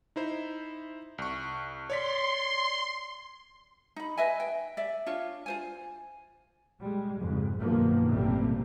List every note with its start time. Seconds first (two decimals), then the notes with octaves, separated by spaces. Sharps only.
0.16 D#4 E4 C5
1.18 C2 C#6
1.90 C#5 D5 C6 B6
3.96 D#4 B5
4.17 B4 D#5 E5 G#5
4.40 G5
4.77 D5 E5
5.06 D4 F4 C#5
5.46 F4 C5 G#5
6.81 G3 G#3
7.20 F2 G#2 C#3
7.59 B1 G2 D#3 F3 A#3 B3
8.12 A1 C3 G3 A3 A#3 C4